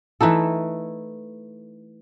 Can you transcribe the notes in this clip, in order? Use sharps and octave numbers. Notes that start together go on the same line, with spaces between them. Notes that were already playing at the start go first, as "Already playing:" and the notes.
E3 A3 D#4 A4